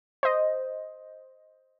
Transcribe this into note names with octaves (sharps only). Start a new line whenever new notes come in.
C5 D#5